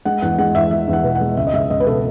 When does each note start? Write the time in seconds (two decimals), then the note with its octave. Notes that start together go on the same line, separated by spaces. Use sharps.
0.05 G#3 F#5
0.22 E2 F#5
0.39 G#3 F#5
0.55 E2 E5
0.71 G#3 E5
0.88 E2
0.93 F#5
1.04 B2
1.15 F#5
1.21 G#3
1.37 C#2 E5
1.47 D#5
1.53 C#2 E5
1.70 C#2 D#5
1.80 B4
1.87 B2 A4